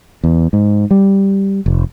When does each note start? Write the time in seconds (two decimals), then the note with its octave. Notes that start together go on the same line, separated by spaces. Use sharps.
0.24 E2
0.53 G#2
0.91 G3
1.66 F1